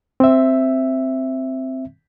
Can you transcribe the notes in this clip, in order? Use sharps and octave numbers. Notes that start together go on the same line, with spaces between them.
C4 E5